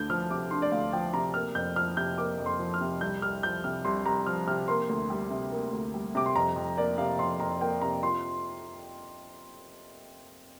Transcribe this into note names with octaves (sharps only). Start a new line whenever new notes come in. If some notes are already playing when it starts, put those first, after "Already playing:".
Already playing: D2 D4 G6
F3 F6
C3 D6
D4 C6
D5
D2 F5
F3 G5
C3 A#5
A#3 F6
F2 G6
F3 F6
C3 G6
A#3 D6
F2
C6
F3
F6
C3
C2 G6
C2 F6
F3 G6
C3 F6
C2 C6
C2 A#5
F3 F6
C3 F6
A#3 C6
D2
G3
C3
A#3
D2
G3
C3 D6
C6
F2 A#5
F2
A#3 D5
C3 F5
F2 C6
F2 A#5
A#3 G5
C3 A#5
F4 C6